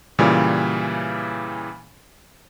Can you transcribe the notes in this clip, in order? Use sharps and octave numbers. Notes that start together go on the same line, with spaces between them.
A#2 C#3 E3 G3